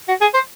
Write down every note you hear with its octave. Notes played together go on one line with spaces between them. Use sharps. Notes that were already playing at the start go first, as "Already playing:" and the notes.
F#4
G#4
C5